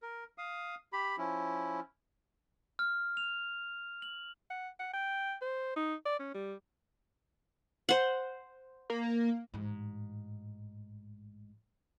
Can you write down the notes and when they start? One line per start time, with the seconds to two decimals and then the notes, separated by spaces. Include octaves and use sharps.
0.02 A#4
0.38 F5 D#6
0.93 G4 B5
1.18 F3 C#4 E4
2.79 F6
3.17 F7
4.02 F#7
4.50 F#5
4.80 F#5
4.93 G5
5.42 C5
5.76 D#4
6.05 D5
6.20 C#4
6.35 G3
7.89 C5 F#5
8.90 A#3
9.54 A1 G#2